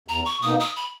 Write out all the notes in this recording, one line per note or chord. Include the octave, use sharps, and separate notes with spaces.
E2 A#5
C#6
B2 A#3 D#4 D#6
D#6
B5